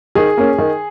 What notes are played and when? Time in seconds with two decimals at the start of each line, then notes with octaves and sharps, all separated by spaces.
0.15 D#3 G#4 G#5
0.37 A#3 C#4
0.58 D#3